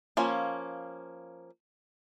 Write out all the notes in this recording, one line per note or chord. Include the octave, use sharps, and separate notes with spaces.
F3 A#3 C#4